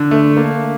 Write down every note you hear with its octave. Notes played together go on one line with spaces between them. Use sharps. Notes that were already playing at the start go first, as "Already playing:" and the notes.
Already playing: D3
A3
A#3